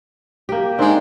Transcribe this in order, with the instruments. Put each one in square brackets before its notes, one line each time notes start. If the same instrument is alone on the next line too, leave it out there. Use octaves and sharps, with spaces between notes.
[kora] A#3 G4
[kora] D#3 [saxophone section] G#3 C4 D4